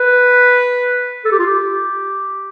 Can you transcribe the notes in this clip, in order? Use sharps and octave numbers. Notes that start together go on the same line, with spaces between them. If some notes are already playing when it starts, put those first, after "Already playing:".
Already playing: B4
A4
G4
F4
G4